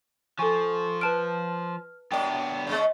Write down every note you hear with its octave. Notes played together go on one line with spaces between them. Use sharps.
F3 A4 G#5 C#6
B4 A5 F6 D7
F#2 B3 D4 D5 G5
C#3 E3 G#3